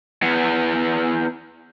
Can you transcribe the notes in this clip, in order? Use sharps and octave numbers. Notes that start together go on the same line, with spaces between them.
B3 E4 G#4 B4 E5 F#5